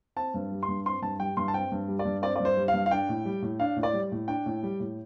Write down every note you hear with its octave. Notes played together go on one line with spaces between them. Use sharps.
C4 A5
G2
G3
C6
G2
C4 C6
G2 A5
G3 G5
G2 C6
A5
C4 G5
G2
G3
D5
G2
C4 D5
G2 D5
C5
G3
F5
G2
F5
D4 G5
A2
G3
A2
D4 F5
A2
D5
G3
A2
D4 G5
A2
G3
A2